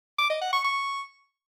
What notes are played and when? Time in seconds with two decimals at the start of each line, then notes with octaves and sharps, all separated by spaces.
0.18 D6
0.30 D#5
0.41 F#5
0.53 C#6
0.64 C#6